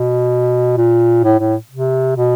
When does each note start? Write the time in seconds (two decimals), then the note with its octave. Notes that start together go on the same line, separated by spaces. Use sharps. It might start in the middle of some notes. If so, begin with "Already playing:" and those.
Already playing: B2
0.77 A#2
1.24 A2
1.39 A2
1.71 C3
2.17 B2